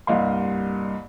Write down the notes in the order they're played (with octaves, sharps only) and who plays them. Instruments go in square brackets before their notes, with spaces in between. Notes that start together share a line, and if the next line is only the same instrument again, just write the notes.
[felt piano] C2 G2 A#3 D#5 F5 C6